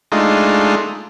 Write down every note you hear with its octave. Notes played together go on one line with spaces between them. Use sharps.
G#3 A3 D4 D#4 F4